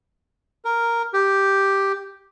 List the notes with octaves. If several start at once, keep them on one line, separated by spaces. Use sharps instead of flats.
A#4
G4